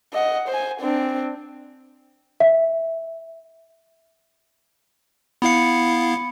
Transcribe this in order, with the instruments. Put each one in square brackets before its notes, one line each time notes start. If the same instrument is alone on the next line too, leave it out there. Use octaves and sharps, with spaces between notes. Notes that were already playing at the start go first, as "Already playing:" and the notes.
[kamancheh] D#5 F#5
C5 G#5
C4 D4
[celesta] E5
[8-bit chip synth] B3 E4 F5 [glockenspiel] B5 C#7